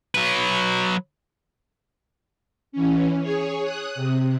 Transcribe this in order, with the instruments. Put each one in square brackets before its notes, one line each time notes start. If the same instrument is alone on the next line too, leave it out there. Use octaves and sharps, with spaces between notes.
[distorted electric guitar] F#3 B4
[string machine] E3 C#4
G#4 C#5
D#6 F#6
C3